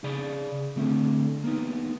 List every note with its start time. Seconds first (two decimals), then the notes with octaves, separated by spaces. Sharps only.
0.04 C#3 G#4 D5 B5
0.76 D3 A3 C4 D4 A4
1.44 A#3 B3 D#4